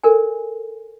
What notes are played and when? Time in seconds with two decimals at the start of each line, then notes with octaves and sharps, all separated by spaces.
0.04 A4 A#4 D5 G#5